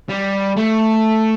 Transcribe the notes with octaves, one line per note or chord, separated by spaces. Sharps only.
G3
A3